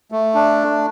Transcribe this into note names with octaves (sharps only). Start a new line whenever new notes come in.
A3
D4